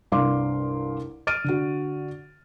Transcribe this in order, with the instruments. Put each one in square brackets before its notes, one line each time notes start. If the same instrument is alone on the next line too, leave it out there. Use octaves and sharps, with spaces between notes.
[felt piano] C2 G2 F5 C6 D6
F6 A6 D7 D#7
D3 F#4